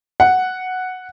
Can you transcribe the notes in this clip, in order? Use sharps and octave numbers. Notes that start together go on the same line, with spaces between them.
F#5